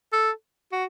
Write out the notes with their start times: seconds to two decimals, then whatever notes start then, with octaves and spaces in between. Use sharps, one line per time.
0.13 A4
0.72 F#4